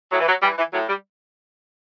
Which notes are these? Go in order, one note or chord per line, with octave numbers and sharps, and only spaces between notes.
A2 F#3
E3
F#3
E3 G3
E3
A2 F#3
G3